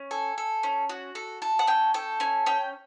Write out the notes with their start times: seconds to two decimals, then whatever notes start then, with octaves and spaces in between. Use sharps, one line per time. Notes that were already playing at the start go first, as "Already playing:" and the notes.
Already playing: C#4
0.11 A4 G#5
0.38 A4
0.63 C#4
0.89 F#4
1.15 A4
1.42 A4
1.59 F#5
1.67 C#4 G5
1.94 A4 G5
2.20 C#4 G#5
2.46 C#4 G5